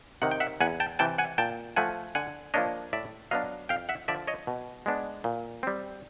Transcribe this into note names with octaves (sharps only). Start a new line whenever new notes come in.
C3 D#3 F#5
G5
E5 F#5
E2 F#5 G#5
G5 A5
C3 E3 G5 A5
F#5 G#5
A#2 G5 A5
F3 A3 F#5 G#5
D3 F#5 G#5
F3 A#3 D4 C#5 D#5
A2 D5 E5
F#3 B3 D4 D#5 F5
F2 F5 G5
E5 F#5
D3 F3 D5 E5
C#5 D#5
B2
G#3 B3 D4
A#2
G3 C4